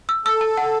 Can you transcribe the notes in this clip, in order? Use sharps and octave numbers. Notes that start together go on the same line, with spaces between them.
E6
A4 E6
A5
F#5